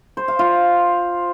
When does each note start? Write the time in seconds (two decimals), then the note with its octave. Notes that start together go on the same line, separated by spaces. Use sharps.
0.17 C5
0.28 F5
0.39 F4